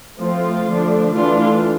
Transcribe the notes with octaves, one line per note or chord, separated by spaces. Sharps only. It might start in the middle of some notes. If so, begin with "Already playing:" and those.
F3 A3 C4 F4
D3 F3 A3 D4
E3 A3 D4 F4